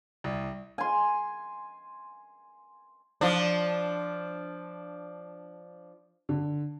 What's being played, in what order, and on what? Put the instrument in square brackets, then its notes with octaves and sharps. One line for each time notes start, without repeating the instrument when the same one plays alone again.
[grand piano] C2
[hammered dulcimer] G#5 C6
[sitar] F3 D4
[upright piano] D3